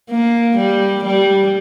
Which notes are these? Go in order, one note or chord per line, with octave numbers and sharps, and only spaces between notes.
A#3
G3
G3